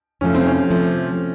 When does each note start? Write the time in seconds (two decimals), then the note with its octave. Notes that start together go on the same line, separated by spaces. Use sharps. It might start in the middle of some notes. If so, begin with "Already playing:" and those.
0.21 F2 C3 F3 A3 C#4
0.35 C4
0.47 C#4
0.70 C3 F3 A3